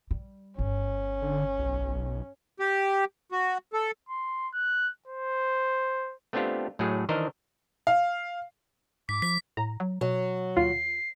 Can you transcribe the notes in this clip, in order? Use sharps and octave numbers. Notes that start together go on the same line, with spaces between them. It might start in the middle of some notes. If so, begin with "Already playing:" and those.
G3
G1 C#4
D3
B1
G4
F#4
A4
C6
F#6
C5
A3 B3 C4 D4 F4 G4
A2 F#3 A3 G#4
D#3 E3 D4 A#4 C5 D#5
F5
G#2 D6 B6
F3 B6
A2 A#5
F#3
B2 F#3
D#2 F4 C7